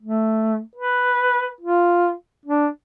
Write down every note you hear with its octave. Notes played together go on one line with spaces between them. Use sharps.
A3
B4
F4
D4